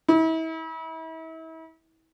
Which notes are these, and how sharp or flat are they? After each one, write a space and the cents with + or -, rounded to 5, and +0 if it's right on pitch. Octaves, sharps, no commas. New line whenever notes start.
E4 -35